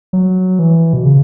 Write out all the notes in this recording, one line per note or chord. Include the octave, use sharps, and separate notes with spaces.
F#3
E3
B2
C#3